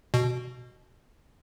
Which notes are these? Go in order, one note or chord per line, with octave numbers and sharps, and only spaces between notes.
B2